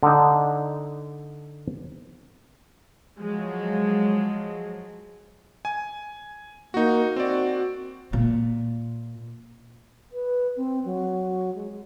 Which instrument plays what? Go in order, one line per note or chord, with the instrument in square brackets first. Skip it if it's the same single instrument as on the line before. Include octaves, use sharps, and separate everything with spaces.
[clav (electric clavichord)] D3 D#4
[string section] F3 F#3 G#3
[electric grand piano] G#5
[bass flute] A#3 [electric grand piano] D#4 F#4
[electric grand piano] C4 D5 [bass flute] F#4
[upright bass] A#2
[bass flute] B4
C4
F#3
G#3